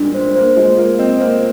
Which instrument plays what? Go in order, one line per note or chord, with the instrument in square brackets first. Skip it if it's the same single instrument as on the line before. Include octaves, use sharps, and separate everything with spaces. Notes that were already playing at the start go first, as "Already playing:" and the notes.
Already playing: [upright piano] A#2 G3 G#3 [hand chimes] D4
[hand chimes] C5
[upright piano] A#3 [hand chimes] C5
[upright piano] G#3 [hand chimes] F4
[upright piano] A#3 [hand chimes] F4
[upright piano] C4 [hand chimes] D#5
[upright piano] A#3 [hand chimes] C5